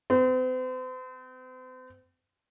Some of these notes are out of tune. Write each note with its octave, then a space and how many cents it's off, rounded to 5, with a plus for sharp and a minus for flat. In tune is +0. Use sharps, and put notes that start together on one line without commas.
C4 -40